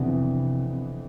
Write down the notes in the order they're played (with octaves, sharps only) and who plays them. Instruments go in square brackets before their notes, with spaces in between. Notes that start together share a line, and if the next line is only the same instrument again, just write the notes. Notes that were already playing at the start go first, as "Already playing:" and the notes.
Already playing: [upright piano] F2 E3 B3 D4 [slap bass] C3